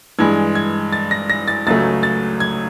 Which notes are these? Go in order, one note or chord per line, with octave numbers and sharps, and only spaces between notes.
G2 E3 G#3 G#6
G#6
A6
A#6
A#6
A6
C#2 C#3 F#3 A3 A6
A6
G#6